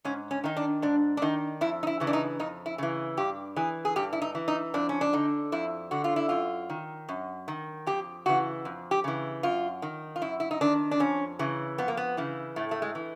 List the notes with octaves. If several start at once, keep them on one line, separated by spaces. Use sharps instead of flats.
G#2 C#4
C#4
D#3 D#4
D4
G#2 D4
D4
D#3 D#4
F2 E4
D#4
E4
C#3 E3
D4
D#4
F2 D#4
E4
C#3 E3
G2 G4
E3 G#4
G#4
G2 G4
E4
D#4
E3
D#4
F2 D4
C#4
D4
D3 D#4
F2 E4
D3 F#4
F4
E4
F#2 F4
D#3
F#2
D#3
F2 G4
C#3 E3 F#4
F2
G4
C#3 E3
F#2 F4
D#3
F4
F#2 E4
E4
D#4
D#3 D4
D4
F2 C#4
C#3 E3
F2 B3
A#3
B3
C#3 E3
A2 A3
A3
G#3
E3